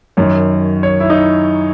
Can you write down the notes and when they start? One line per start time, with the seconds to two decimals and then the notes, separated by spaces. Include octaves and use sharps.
0.17 F#2 D#3 C#5
0.83 C#5
1.00 E4
1.10 D#4
1.16 E4